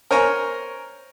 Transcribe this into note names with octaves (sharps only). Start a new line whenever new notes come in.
A#4 C5 C#5 G#5 A#5